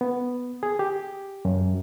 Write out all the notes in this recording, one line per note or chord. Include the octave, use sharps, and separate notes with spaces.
B3
G#4
G4
F#2